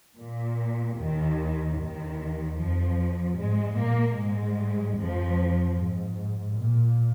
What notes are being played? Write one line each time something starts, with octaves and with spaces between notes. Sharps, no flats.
A#2
D#2 D#3
D#2 D#3
F2 F3
G#2 G#3
A#2 A#3
G#2 G#3
F2 F3
G#2
A#2